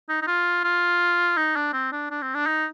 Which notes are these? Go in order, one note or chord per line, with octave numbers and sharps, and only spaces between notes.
D#4
D#4
F4
F4
D#4
D4
C4
D4
D4
C4
D4
D#4